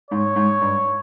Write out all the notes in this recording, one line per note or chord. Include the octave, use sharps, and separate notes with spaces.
G#2 C#5
G#2
G2